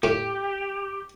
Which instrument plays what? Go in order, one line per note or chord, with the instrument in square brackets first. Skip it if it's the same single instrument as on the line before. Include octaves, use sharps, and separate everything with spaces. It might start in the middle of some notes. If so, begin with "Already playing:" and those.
[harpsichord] A2 [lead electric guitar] G4